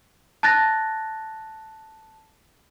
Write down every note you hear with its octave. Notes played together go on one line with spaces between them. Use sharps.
A5 F#6 A6 A#6